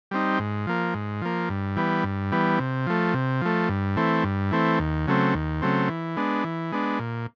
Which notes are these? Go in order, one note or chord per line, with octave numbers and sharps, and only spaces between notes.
G3 C4 D#4
G#2
F3 A#3
G#2
F3 A#3
G2
E3 G3 B3
G2
E3 G3 B3
C3
F3 A3
C3
F3 A3
G2
E3 A3 C4
G2
E3 A3 C4
D#2
C#3 F#3 A3 C4
D#2
C#3 F#3 A3 C4
E3
G#3 B3 D4
E3
G#3 B3 D4
A#2